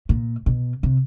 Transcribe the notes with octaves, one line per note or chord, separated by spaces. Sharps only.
A#2
B2
C3